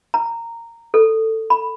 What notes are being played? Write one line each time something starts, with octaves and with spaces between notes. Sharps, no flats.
A#5
A4
B5